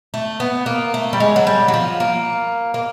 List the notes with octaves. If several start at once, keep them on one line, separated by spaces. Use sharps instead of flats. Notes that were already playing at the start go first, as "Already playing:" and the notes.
A3
B3
A#3
A3
G3
G#3
F#3
G3
F#3
F3
A#3
A#3